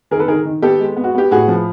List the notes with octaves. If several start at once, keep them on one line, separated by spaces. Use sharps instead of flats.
D#3 G#4 A#4
A4 B4
D#3 G#4 A#4
D#3
B3 G4 A4
G#3
B3
F#4
B3 G4
A2 F#4 G#4
F3